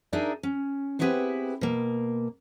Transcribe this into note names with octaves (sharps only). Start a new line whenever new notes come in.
D4 D#4 G#4 A#4 D5 E5
C#4
B3 C4 E4 G4 G#4 B4
B2 A#3